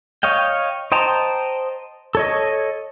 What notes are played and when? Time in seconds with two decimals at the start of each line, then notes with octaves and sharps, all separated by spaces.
0.23 C#5 D#5 F5 G5
0.92 C5 D#5 G5 A5 A#5
2.15 A4 C#5 D#5